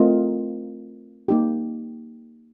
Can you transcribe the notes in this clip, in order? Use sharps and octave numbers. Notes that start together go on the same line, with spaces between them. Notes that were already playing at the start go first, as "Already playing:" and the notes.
Already playing: A3 C4 F4 A#4 D#5
A#3 D#4 G4